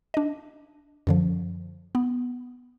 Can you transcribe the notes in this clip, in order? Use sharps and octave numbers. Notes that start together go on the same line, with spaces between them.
D4 D#5
F#2 D3 F3
B3